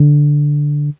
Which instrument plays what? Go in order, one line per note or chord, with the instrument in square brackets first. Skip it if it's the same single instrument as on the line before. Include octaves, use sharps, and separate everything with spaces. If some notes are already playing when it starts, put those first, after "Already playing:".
Already playing: [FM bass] D3